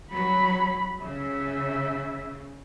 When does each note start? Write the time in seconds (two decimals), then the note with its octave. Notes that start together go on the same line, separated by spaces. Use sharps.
0.12 F#3 B5
1.02 C#3 E5